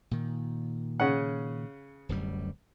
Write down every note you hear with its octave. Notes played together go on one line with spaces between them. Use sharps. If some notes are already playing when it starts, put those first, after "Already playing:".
A#2 D#3
C#3 C#4 F#5
D1 F#2 G3